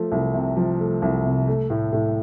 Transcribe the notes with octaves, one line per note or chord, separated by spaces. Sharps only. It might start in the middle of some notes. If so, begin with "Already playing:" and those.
Already playing: F3 A3
C2
C3
F3
A3
C2
C3
A3
A2
A2